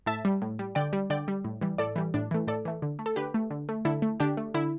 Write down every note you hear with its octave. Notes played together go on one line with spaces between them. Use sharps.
A2 E5 A5
G3
A2
G3
D3 D5 G5
G3
D3 D5 G5
G3
A2
E3 G3
A2 A4 D5
E3 G3
A2 D4
E3 A3
A2 A4 D5
E3 A3
D3
A3
A4
D3 G4 B4
A3
D3
A3
D3 E4 A4
A3
D3 D4 G4
A3
D3 E4